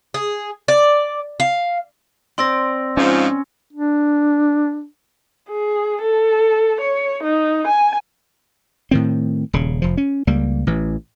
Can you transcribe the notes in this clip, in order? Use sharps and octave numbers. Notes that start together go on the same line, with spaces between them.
G#4
D5
F5
C4 C5 D5 C6 E6 A#6
G#2 F3 C#4
D4
G#4
A4
C#5
D#4
G#5
A2 D#3 C4
D#1 C#3
F1 F3
C#4
C#2 G3 A#3
A1 E3